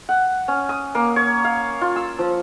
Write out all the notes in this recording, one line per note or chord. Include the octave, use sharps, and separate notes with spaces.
F#5
C#4
D#6
A#3
C#5
F5
F4
E6
F3